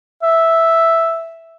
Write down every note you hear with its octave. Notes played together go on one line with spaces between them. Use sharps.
E5